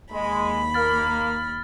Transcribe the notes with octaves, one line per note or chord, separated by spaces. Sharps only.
D#2 G#3 B5
A#3 F6 A6